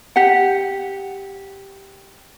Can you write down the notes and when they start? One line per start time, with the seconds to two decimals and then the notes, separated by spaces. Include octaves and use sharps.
0.16 G4 F#5